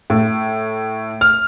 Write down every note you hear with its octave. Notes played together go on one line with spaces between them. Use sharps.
A2
F6